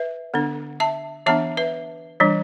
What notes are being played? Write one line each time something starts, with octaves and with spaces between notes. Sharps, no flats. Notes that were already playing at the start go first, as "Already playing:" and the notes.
Already playing: B4 E5
D3 B3 D4
E5 A5
E3 B3 D4 E5 A5
B4 E5
E3 G3 D4